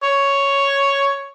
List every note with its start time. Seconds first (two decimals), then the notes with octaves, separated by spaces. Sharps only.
0.03 C#5